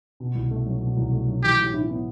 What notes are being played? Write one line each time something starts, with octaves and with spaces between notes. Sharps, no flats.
B2
C2
A3
F#3
B2
C2
A3
F#3
E3 G4
A2
E4
B3